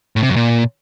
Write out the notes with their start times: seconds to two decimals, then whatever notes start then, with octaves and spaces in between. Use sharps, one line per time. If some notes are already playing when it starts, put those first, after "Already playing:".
0.16 A2
0.23 C3
0.29 F#2
0.36 A#2